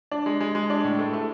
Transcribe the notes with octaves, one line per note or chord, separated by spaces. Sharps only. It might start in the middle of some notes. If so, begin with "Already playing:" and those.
D4
G#3
G#3
G#3
D4
A2
A3
A3